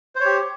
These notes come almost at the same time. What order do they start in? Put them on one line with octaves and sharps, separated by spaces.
C5 C#5 G4